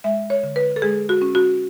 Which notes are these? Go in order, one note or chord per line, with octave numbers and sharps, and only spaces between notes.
G#3 E5
C#5
D3
B4
A4
G#3 G#4
F#4
C#4
F#4